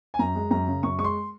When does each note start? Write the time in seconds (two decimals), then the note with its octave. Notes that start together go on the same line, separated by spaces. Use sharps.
0.14 G#5
0.19 F#2 A#5
0.35 G#3
0.51 F#2 A#5
0.68 C#3
0.83 F#2 C#6
0.99 G#3 C#6
1.04 C6